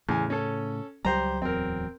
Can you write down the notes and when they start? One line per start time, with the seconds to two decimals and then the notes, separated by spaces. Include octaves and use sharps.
0.09 E2 A2 C#3 G#5
0.30 C#4 A4
1.05 C#2 F#3 G3 G4 C5 A#5
1.42 D1 E2 F#3 C4 A#4